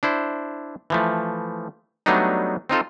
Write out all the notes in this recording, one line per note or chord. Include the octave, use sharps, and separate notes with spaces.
D4 E4 C5
E3 F3 A3
F#3 G3 A3 B3 D4 D#4
C4 D#4 F4 A4